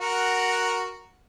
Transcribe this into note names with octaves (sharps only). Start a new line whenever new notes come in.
F#4 A#4 F#5